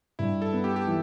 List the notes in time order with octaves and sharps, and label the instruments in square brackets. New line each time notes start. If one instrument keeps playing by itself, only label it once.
[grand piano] G2 [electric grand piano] E4
[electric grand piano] A4
[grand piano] B3
[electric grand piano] G4
G4
[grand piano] E3